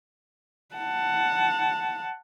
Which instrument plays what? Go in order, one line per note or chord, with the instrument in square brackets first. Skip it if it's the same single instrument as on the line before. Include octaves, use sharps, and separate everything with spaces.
[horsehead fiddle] F#5 A5